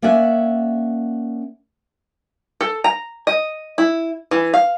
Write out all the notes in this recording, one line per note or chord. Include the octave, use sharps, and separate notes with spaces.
A#3 C#4 D5 E5 F#5
A4
A#5
D#5
E4
E3
F5